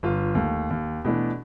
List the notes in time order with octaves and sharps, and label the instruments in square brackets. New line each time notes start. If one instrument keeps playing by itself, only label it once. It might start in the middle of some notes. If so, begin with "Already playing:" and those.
[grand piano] G1 F4
D#2 A3
D#2
B2 E3 A3 D4